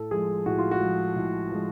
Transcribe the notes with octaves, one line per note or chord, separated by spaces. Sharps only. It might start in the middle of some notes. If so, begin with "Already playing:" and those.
Already playing: A2 A4
F3 G#3 G#4
A2 F#4
F4
F#4
F3 G#3
A2
F3 G#3